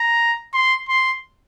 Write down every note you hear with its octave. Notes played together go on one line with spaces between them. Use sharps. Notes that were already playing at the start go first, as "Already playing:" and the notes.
Already playing: A#5
C6
C6